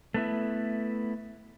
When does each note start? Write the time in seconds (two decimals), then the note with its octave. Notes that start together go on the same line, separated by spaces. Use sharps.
0.14 A3 B3 E4